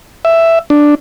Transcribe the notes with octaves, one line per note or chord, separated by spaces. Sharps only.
E5
D4